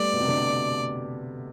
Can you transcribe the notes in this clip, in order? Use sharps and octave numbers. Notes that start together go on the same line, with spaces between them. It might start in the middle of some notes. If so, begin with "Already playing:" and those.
Already playing: G3 A3 B3 D5
B2
C3
D3